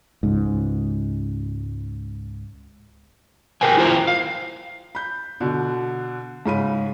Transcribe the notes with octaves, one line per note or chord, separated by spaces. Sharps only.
C#2 G#2
G#4 A#4 B4 G5 G#5
E4 F4 C5 G5 A#5
F5
B5 G6
B2 D3
G#2 C#3 B5 D#7